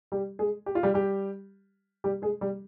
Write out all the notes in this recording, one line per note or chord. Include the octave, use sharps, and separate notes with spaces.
G3 G4
G#3 G#4
G4
F4
G3 G4
G3 G4
G3 G4
G#3 G#4
G3 G4